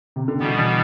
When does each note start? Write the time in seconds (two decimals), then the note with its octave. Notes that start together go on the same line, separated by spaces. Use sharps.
0.16 C3
0.28 D3
0.40 B2 E3 G3 B3
0.57 E3